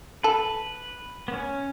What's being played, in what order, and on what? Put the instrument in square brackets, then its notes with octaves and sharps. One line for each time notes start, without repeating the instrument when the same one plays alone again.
[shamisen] A4 [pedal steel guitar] B4
[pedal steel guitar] B3
C#4